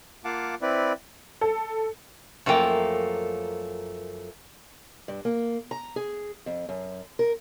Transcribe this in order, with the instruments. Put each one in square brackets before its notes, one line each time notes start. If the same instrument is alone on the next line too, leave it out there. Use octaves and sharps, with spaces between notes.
[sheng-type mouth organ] A#3 F4 F5 F#5 A5 D6
C4 E4 B4 D5
[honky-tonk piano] A4
[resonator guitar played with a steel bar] F#2 F3 A3 A#3 G5
[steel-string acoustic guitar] G2
A#3
A#5
G#4
F2
F#2
A#4